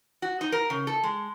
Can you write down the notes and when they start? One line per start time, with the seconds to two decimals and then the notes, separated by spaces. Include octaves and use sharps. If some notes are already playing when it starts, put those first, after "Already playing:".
0.22 F#4
0.41 D#4
0.52 A#4
0.70 C#3
0.87 A4
1.03 G#3